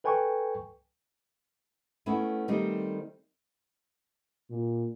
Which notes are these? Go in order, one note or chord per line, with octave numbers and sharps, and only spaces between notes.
A4 B4 G5 G#5 C#6
A3 B3 C#4 E4
D#3 G3 A3 C4 D#4
A#2